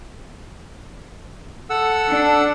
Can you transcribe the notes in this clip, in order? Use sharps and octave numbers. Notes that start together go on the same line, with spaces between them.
A4 F#5 E6
D4